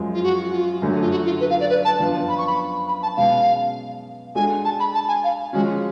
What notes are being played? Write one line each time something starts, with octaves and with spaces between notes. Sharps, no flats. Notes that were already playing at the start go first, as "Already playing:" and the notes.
Already playing: F#2 F3 G#3
F4
F#4
F4
F#2 D3 F#3 A3
F4
F#4
F4
B4
F5
D5
B4
A5
F#2 F3 B3 D4 F4
B5
C#6
B5
B5
A5
B2 G#3 C#4 F5
G#3 D4 F#4 A4 G#5
A5
B5
A5
G#5
F5
F3 G#3 C#4 F#4